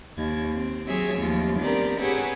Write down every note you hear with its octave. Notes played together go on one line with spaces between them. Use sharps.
D#2 G#6
C4
F#3 C4 G#4 C#5 E5
D#2 F3 A3
B3 C4 D4 G4 A#4 D5
G4 G#4 B4 C#5 E5 F#5